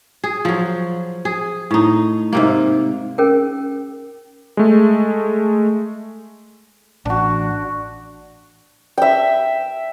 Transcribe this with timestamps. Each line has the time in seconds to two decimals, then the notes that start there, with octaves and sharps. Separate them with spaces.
0.24 G#4
0.45 F3 F#3
1.25 G#4
1.71 A2 D#4
2.33 G#2 C3 A#3
3.18 C#4 G#4 A#4 G5
4.57 G#3 A3
7.05 A1 D4 F#4
8.98 E5 G5